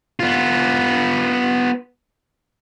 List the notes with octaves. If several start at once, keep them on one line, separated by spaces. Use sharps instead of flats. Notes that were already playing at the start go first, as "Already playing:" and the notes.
B3 F4